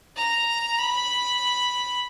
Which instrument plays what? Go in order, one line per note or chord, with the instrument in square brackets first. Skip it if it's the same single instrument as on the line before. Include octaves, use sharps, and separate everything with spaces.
[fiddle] A#5
B5